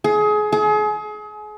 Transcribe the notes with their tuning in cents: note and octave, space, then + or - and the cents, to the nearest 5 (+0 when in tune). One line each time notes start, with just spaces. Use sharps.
G#4 +25
G#4 +35